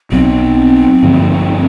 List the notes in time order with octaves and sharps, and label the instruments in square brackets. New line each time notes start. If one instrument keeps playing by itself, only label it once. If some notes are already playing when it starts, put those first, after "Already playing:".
[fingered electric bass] B1 B2 F#3 [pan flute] C4
[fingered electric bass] G2 D3 F3 A#3